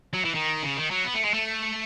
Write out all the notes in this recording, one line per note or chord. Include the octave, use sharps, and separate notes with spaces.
F#3
E3
D#3
C#3
D#3
F#3
B3
A3
G#3
A3